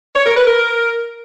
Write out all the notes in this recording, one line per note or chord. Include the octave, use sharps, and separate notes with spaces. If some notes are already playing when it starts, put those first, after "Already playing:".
C#5
A#4
B4
A#4